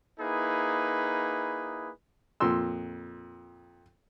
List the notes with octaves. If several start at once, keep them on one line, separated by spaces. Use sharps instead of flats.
A#3 D#4 E4 G#4 B4
F2 A#2 C6 E6